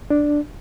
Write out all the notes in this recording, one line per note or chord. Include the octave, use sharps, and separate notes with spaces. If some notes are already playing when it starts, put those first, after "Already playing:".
D4